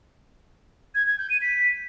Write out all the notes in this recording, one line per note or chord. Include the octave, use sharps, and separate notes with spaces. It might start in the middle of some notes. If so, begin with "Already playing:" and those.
G#6
G#6
G6
D#7
B6